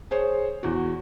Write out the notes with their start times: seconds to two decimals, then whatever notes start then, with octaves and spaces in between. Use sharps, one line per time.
0.11 G#4 C5 C#5
0.63 E2 F#4